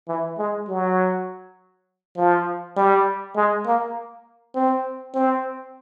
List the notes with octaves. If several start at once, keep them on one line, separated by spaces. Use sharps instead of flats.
E3
G#3
F#3
F3
G3
G#3
A#3
C4
C4